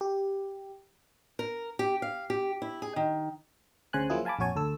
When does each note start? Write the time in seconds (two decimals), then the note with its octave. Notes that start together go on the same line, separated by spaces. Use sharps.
0.01 G4
1.39 A#4
1.79 G4
2.02 F5
2.30 G4
2.62 E4
2.82 G#4
2.96 D#3
3.93 D2 C#3 C5 G#5 F#6
4.10 F3 F#3 A#3 E4 F4 G#4
4.25 F5 G#5 A5 B5 D6
4.39 A#1 F2 F#4 C#5 G#5 A5
4.56 D2 A4 E6